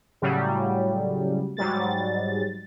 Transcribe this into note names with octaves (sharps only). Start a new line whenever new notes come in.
A2 C#3 F#3 G3
G#2 F#3 G3 A6